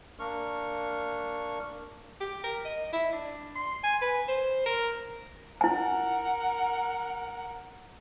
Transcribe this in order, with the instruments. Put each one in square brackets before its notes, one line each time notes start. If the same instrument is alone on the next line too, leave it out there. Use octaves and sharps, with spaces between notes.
[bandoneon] A#3 D4 A#4 C#6 F6
[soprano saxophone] G4
A#4
D#5
E4
D4
C6
G#5
B4
C5
A#4
[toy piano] E4 G#5 [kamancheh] A#4 F#5